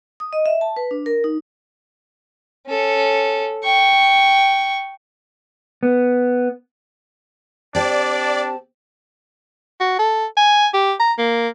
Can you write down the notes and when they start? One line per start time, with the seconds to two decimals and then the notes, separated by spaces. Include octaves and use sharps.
0.20 D#6
0.33 D#5
0.46 E5
0.61 A5
0.77 B4
0.91 D4
1.06 A#4
1.24 D#4
2.67 C#4 A4
3.64 G5 C#6
5.83 B3
7.75 C4 D4 G4 D5 A5
9.81 F#4
9.99 A4
10.37 G#5
10.74 G4
11.00 A#5
11.18 A#3